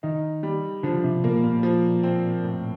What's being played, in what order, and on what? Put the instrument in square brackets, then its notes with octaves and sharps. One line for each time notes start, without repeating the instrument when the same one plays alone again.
[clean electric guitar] D#3 [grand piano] D#4
[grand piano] G3
[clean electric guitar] D3 [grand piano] F3
[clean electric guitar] C3
[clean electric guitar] A#2 [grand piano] A#3
[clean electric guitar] A#2
[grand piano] F3
C4
A2